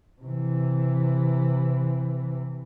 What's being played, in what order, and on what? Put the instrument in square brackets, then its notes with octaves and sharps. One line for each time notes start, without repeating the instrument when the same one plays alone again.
[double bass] C3 E3